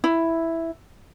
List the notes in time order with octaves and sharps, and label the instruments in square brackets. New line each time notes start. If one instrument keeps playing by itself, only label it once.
[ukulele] E4